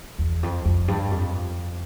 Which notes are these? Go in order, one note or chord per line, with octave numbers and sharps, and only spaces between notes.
E2
F2
F2
G2
F2